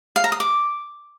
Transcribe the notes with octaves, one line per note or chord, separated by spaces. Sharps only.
F5
A#5
D#6
D6